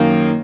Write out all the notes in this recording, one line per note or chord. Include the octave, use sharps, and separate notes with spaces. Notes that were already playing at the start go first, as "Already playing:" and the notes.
Already playing: F#2 D#3 A#3 D#4